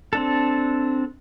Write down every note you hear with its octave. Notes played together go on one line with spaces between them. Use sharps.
C4 D4 A4